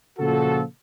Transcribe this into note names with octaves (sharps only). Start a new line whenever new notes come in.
A#2 C#3 F3 F#4 A4